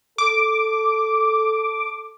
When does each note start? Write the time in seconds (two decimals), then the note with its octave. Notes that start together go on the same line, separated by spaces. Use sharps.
0.18 A4 D6